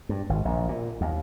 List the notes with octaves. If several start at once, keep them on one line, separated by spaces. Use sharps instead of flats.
G2
G#1
A#1
A#2
D#2